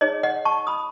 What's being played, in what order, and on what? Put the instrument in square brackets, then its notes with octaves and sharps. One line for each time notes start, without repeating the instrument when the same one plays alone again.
[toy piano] D#4 G#4 C#5 D#5
D#5 F#5
A5 C#6
B5 D#6